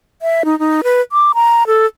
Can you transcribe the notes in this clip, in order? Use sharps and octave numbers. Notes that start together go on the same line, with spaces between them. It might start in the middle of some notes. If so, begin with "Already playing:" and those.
E5
D#4
D#4
B4
D6
A#5
A4